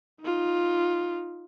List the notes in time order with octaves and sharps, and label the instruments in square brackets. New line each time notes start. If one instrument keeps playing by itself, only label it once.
[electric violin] D#4 F4